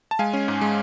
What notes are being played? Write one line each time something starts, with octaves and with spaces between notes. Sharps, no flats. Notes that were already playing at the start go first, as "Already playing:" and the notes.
A5
G#3 F5 G#5
C#4
G#2
G#3